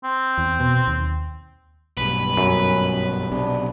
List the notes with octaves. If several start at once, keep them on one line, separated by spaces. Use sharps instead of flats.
C4
E2
B2
D#2
B1 G2 B4
F#2 C#4
B1 C3 D4